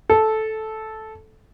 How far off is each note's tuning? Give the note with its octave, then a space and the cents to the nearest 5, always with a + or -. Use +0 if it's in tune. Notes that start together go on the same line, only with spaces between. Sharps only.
A4 -10